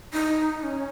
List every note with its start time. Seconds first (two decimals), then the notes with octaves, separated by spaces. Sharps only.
0.13 D#4
0.63 C#4